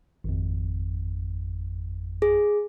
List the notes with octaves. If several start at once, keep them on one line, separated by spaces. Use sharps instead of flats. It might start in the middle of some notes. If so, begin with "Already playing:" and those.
G#1 F2
G#4